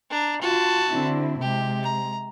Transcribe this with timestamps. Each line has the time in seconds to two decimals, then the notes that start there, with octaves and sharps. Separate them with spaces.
0.10 D4 A#5
0.42 F4 F#4 A5
0.89 D3 C4 E4
1.41 C3 G#3 G4
1.83 A#5